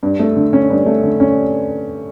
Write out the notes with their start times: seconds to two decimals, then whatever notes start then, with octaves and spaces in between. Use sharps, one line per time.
0.03 G2
0.20 A3
0.37 D3
0.53 C#4
0.70 G2
0.86 A3
1.03 D3
1.20 C#4